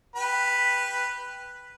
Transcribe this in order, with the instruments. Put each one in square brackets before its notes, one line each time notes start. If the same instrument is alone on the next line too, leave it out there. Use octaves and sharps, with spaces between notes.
[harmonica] G4 B4 B5